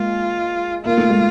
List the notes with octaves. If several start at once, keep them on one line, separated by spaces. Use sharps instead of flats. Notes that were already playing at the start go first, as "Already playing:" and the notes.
Already playing: G#3 A#3 F4
A#3 F4
A3
G#3